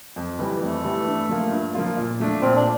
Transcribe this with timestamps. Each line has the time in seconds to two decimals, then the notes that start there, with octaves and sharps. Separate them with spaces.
0.16 F2
0.39 E3 G3
0.61 F2 A3
0.84 E3 G3
1.07 G2
1.29 F3 A#3 F4
1.51 G2
1.74 F3 A#3 F4
1.97 A#2
2.20 F3 A3 D4
2.42 A#2 C4
2.56 D4